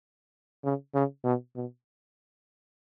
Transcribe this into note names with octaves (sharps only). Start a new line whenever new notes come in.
C#3
C#3
B2
B2